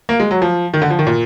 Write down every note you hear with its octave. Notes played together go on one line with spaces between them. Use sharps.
A#3
G#3
F#3
F3
D#3
D3
F3
D#3
A#2